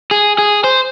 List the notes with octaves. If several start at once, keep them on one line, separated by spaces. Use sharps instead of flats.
G#4
G#4
C5